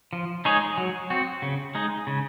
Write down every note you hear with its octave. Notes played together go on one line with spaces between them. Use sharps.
F3
G#3 D#4 G#4 C#5
F#3
C4 F#4
C#3
G#3 D#4
C#3